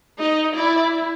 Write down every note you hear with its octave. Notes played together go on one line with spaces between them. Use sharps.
D#4 D#5
E4 D5